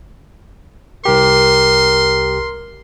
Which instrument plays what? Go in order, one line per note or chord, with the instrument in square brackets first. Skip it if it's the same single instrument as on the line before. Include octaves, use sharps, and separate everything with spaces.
[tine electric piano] C2 G4 [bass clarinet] A#4 [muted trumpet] C6